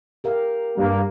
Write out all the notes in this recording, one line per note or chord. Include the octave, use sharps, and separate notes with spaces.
G4 A#4 F5
G2 A#3